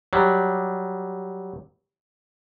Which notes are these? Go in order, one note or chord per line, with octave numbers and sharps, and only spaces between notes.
F#3 G3